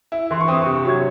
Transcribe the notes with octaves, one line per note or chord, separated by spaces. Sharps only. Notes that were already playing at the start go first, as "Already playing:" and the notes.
E4
E3 C6
C#6
C4 D#6
C#6
C3
C#6
F#3 G#6